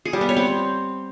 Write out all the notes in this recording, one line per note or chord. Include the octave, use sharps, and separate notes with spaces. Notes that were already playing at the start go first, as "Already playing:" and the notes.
G#4
G3
B3
C#5
C4